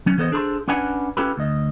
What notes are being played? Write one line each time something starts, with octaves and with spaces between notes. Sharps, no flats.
F#3 C#4
E3 B3 A4 C5 D5 D#5
D4 G#4 A4 C5 B5 C6
C#4 D4 B4 F#5 G#5
C#4 F4 G4 A4 B4
D2 D#5